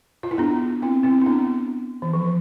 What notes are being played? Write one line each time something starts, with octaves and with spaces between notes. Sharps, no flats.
F4
E4
B3 D4
C4 E4
C4 E4
E4
B3 D4
E3
F3